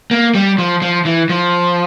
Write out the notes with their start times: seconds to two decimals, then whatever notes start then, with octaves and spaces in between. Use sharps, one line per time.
0.11 A#3
0.35 G3
0.58 F3
0.82 F3
1.05 E3
1.29 F3